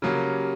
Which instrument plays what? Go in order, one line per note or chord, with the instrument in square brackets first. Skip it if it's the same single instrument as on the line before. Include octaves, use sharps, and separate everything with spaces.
[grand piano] C#3 F#3 A#3 C#4 [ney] G4